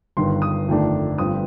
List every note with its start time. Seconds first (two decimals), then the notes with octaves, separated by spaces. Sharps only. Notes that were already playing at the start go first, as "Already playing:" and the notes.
0.17 G1 G2 D#3 C6
0.42 D#6
0.68 G1 F2 D#3 A3 D4
1.18 G1 G2 F3 C4 D#6